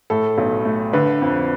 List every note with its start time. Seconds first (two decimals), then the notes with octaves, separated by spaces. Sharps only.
0.10 A2 A4
0.38 B1
0.65 A3
0.93 D3 B4
1.22 F2